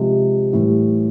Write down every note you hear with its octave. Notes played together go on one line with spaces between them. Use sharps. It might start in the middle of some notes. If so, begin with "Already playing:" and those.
Already playing: C3 F3 G#3
A2 E3 G3